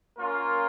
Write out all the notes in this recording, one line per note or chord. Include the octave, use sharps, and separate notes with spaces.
A#3 C#4 F4 A#4